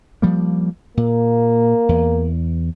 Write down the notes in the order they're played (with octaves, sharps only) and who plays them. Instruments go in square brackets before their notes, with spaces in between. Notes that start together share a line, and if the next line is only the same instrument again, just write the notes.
[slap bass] F3 G3 A#3
[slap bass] A#2 [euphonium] A#3
[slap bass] E2